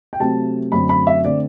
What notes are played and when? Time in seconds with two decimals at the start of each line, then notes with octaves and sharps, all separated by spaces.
0.13 G5
0.20 C3 F#3 A3 C4 A5
0.72 F#2 D3 A3 C4 B5
0.89 B5
1.07 E5
1.24 D3 A3 C4 D5